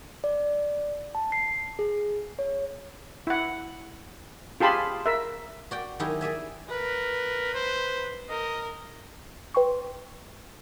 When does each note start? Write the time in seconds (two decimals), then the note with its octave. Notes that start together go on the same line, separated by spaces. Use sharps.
0.24 D5
1.15 A5
1.32 C7
1.79 G#4
2.39 C#5
3.27 E4 F#5
4.60 F4 G4 G#4 A5 B5 C6
5.06 A#4 E5
5.71 F#4 D5 G5
6.00 D#3 F#3 D#4 E4 G4 G#4
6.21 G#4 D5 E5 G#5
6.69 A#4 B4
7.54 C5
8.29 A#4 D#5
9.54 B4 G5 C6 C#6